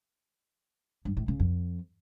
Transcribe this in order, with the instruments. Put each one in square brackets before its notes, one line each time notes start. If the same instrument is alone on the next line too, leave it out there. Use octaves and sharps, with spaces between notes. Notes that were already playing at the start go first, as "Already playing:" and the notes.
[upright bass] G2
A2
C#3
F2